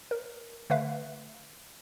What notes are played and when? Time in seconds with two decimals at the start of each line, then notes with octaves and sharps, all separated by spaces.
0.11 A#4
0.70 D3 A3 B4 E5 F5